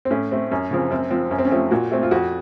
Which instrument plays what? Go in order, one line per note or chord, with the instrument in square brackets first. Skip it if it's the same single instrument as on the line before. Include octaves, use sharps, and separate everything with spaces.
[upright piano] C4
A2 C#4
A3 C4
F#2 C#4
C#3 F3 C4
F#2 C4
F3 C4
F#2 C#4
C4
C#4
F3 A3 C4
A#2 F#4
A3 C4
F4
F2 F#4